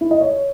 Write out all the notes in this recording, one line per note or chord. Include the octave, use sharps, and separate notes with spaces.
E4
D#5
C#5